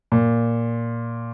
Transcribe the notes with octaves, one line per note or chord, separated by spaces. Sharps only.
A#2